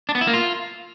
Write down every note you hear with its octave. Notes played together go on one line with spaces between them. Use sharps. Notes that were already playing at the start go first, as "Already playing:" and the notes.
D4
B3
E4
A#3
F4